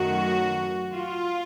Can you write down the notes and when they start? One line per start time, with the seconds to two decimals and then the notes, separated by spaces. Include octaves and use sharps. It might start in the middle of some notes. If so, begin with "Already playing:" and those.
Already playing: F#2 D#3 F#3 A3 F#4
0.93 F4